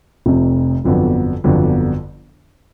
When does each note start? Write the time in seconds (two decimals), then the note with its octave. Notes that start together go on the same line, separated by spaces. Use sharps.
0.26 F1 F2 C3
0.84 G1 F2 D3 F#3 B3
1.44 G1 F2 D3 F#3 B3